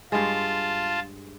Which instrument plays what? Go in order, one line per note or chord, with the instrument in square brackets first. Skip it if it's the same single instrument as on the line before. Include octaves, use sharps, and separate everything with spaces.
[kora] G2 G#3 [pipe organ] F4 A5